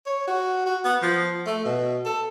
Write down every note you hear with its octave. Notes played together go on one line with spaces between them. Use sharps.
C#5
F#4
F#4
B3
F3
A3
B2
A4